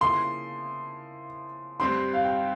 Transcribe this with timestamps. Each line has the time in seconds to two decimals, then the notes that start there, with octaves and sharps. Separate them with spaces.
0.01 C#3 F3 A#3 E4 C6
1.80 G2 G3 C4 G4 C6
2.13 F5
2.24 G5